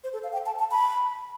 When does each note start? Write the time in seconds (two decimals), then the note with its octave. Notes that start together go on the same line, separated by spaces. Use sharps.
0.04 C5
0.13 A4
0.24 F5
0.33 G5
0.46 A5
0.59 A5
0.71 B5